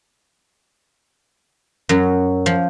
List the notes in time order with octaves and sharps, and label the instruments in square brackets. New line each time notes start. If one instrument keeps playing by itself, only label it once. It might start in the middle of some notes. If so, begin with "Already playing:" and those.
[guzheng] F#2 F#3
F3